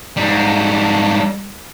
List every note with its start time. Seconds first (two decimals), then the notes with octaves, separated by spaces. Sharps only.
0.17 G#2 G3